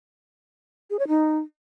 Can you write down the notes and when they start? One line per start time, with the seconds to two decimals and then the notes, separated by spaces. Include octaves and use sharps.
0.90 G#4
0.99 C#5
1.08 D#4